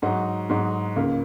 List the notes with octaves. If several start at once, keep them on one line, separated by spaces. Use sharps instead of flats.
G#2 F#3 D#4 F#4
G#2 F#3 D#4 F#4
C#2 C#3 A#3